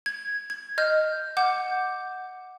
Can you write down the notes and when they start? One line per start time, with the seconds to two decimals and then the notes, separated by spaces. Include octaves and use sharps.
0.06 G#6
0.50 G#6
0.78 D#5 F6 G6
1.37 F#5 D6 G6